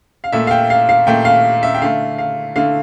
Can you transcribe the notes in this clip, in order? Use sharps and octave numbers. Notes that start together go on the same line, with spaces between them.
F5
A#2 A3 E5
F5
G5
F5
F5
A#2 A3 G5
F5
E5
G5
D3 A3 F5
F5
D3 A3 F5